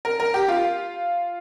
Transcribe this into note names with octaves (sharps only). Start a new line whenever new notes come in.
A#4
A#4
G4
F4